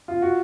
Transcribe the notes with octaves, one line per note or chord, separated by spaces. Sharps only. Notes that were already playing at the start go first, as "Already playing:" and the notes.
F4
F#4